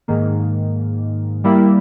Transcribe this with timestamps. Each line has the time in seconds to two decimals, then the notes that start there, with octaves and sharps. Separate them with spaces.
0.08 G#2 D#3 A#3
1.44 G3 A#3 E4